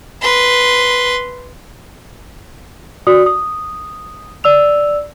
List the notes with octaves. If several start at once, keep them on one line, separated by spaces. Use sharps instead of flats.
B4 C6
F#4 D5 D#6
D#6
D5 E6 F7